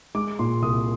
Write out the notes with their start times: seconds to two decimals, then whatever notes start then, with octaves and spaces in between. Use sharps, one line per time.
0.15 G#3 D6
0.39 A#2 C6
0.62 C2 D#6